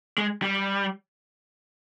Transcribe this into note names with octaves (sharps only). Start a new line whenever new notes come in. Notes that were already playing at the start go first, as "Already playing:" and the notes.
G#3
G3